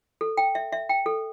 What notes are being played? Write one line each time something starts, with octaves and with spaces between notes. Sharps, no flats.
A4
G5
E5
E5
G5
A4